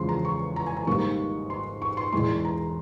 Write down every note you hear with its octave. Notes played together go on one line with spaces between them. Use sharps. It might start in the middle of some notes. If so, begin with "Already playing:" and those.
Already playing: E2 C#3 F3 G#3 C6
A#5
C#6
A#5
G#5
A#5
G#1 G#2 G3 A#3 C#6
C6
C#6
C6
E1 E2 E3 G#3 C6
A#5